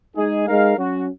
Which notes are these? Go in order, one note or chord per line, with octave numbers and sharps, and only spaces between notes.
G#3 D#4 G#4
G#3 D#4 A#4 F5
F#3 C#4 F#4